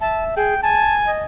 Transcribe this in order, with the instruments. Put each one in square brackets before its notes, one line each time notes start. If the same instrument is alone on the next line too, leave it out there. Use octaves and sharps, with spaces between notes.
[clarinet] E5 [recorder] A5
[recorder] G#4 [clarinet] G5
[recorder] G#5 [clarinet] A5
[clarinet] D#5